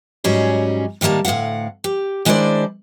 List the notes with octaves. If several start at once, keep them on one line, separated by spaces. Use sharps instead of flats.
G#2 F#3 G3 C#4 D#4 G#4
A2 D#3 G3 A#3 A5
D2 A2 E3 F5 F#5
G4
D#3 G#3 D4 E4 C5 D5